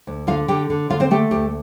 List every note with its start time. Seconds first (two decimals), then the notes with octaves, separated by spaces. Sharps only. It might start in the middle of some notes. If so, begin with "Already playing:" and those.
0.07 D2
0.27 D3 F4 F5
0.48 D3 G4 G5
0.70 D3
0.90 D3 F4 F5
1.00 C4 C5
1.11 A3 G4 G5
1.31 D2 G4